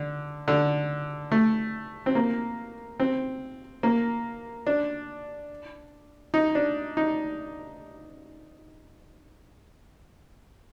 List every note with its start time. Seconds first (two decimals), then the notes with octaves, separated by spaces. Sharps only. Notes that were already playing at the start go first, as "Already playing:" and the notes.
Already playing: D3
0.48 D3
1.32 A3
2.06 C4
2.15 A#3
3.00 C4
3.83 A#3
4.67 D4
6.34 D#4
6.55 D4
6.97 D#4